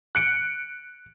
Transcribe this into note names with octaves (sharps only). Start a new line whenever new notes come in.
F#6 C#7 D7